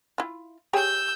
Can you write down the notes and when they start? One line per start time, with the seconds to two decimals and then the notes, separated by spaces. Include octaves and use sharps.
0.18 E4 F4
0.73 G4 G#4 C#5 E6 G6